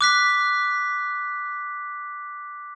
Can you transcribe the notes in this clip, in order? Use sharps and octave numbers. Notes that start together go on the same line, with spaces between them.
D6 F#6 B6